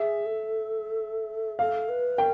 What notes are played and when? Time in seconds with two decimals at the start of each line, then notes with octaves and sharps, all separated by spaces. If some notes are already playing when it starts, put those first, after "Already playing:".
Already playing: G#4 E5
0.26 A4
1.59 A4 F5
1.89 B4
2.18 A#4 G5